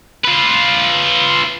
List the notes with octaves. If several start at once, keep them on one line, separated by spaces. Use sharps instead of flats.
F4 B4